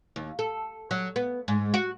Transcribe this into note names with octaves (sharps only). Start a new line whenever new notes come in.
D#2
A4
F#3
B3
G#2
F#4